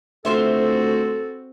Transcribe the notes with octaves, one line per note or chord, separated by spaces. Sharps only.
D2 C4 F4 F#4 A4 C5 E5